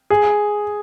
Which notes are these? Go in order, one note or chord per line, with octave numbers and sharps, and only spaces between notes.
G#4